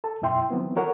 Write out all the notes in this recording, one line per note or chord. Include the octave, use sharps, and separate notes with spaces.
A4 A5
F#2 B2 E4 E5 G5 C6
D#3 E3 F#3 B3 C4 E4
F#4 A4 A#4 C#5 F#5